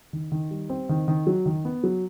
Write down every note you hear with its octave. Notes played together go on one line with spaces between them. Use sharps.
D#3
D#3
G3
C4
D#3
D#3
F#3
D#3
B3
F#3